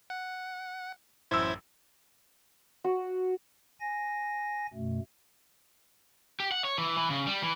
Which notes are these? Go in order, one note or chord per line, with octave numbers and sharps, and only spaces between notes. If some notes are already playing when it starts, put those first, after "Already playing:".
F#5
A1 F#2 E4 C5 E6 G#6
F#4
G#5 A#6
F#2 B2 A3
G4
F#5
C#5
E3
E3
C#3
G3
E3